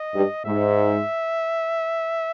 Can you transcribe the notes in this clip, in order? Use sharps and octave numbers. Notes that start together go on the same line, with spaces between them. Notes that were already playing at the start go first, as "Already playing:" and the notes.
Already playing: D#5
G2
G#2 E5